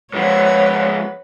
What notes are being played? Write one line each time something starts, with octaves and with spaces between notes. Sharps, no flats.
G#2 F3 B4 C#5 F#5